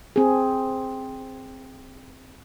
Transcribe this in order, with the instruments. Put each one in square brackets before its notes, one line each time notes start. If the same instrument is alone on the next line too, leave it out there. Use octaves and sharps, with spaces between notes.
[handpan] C4 G#4